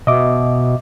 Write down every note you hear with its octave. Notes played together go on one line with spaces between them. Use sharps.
B2 D#5 E5 D6